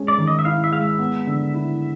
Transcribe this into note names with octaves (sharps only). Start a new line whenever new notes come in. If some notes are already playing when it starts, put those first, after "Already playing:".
Already playing: G#3 C#4
D5
D#3
D#5
E5
E4 F5
E5
G#3 F5
E5
B3
D3
E4